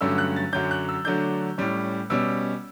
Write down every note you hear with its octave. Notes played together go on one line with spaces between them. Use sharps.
G2 D3 F#3 A3 C#4 E6
F#6
A6
F#2 D3 F#3 C#4 G6
F#6
E6
D3 F#3 A3 D4 G6
A2 G3 C#4
B2 G3 C#4 E6